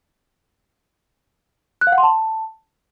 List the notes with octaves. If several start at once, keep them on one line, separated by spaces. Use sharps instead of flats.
F#6
F5
F#5
C6
A5